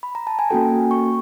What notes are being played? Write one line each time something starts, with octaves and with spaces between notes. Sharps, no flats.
B5
A#5
A5
G#5
A#3 C#4 F#4 A4 G5
C#6